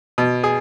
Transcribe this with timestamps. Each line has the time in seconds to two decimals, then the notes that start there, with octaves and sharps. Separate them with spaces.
0.18 B2
0.44 G#4